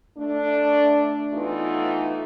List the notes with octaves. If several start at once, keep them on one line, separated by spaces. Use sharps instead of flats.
A3 D4
E3 A3 B3 D#4 F4